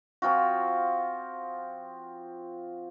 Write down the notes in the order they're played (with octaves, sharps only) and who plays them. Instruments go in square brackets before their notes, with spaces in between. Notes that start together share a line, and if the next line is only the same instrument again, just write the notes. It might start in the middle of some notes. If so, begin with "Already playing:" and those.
[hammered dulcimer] F3 C4 F4 F#4